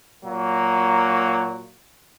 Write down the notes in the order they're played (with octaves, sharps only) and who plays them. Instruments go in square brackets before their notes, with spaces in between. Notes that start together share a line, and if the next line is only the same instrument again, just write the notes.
[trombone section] A#2 F#3 A#3